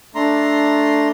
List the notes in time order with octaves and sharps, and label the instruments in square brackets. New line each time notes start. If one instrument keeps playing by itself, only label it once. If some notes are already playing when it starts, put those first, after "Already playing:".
[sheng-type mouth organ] A3 D4 A#5 C6